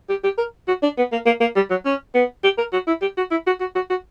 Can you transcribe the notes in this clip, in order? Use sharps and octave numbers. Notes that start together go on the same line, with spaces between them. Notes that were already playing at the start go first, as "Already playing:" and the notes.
G4
G4
A#4
F#4
D4
B3
A#3
A#3
A#3
G3
F#3
C#4
B3
G4
A#4
F#4
E4
G4
F#4
E4
F#4
F#4
F#4
F#4